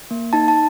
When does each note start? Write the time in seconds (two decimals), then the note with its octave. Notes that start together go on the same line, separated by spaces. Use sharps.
0.11 A#3
0.33 D#4 A5
0.48 A5